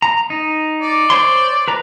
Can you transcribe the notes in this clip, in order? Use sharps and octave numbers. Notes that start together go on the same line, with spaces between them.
A#5
D#4
D5
C5 C#5 C6
B4 A#5